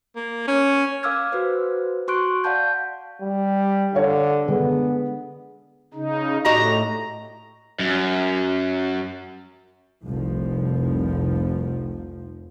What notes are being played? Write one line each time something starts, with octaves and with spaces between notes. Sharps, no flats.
A#3
C#4
A#4 F5 D6 E6 F6 G#6
F#4 B4 C5
F#4 C6 C#6 F#6 D7
D5 F5 F#5 A5 G6
G3
D3 C#5 F5
D3 G#3 B3
C#3 D#4
A2 F#4 G4 D#5 A#5
F#2
F1 C2 F3